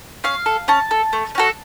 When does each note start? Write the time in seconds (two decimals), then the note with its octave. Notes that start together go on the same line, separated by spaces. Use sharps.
0.24 C#4 F5
0.46 A4
0.68 C#4 A5
0.91 A4
1.13 A3
1.35 C#4 F#4 A4